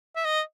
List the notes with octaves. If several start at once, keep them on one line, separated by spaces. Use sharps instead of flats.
E5
D#5